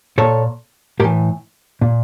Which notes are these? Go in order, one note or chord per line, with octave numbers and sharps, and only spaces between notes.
A#2 A4 C#5
A2 E3 G4 A#4
A#2